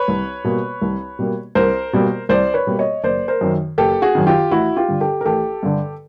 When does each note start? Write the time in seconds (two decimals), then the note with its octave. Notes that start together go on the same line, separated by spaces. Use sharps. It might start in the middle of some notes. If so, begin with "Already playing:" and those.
Already playing: B4 C#5
0.08 C2
0.44 B2 G3 A#3
0.82 C2
1.19 B2 G3 A#3
1.55 C2 A#4 C5
1.93 B2 G3 A#3
2.29 C2 C5 D5
2.54 B4 C#5
2.67 B2 G3 A#3
2.79 C#5 D#5
3.04 F#1 C5 D5
3.28 A#4 C5
3.41 F#2 D#3
3.78 F#1 G4 A4
4.02 F#4 G#4
4.15 F#2 D#3
4.27 F4 G4
4.51 A1 E4 F#4
4.76 F4 G4
4.89 G2 D3
5.01 G4 A4
5.21 A#4
5.26 A1 G4 A4
5.63 G2 D3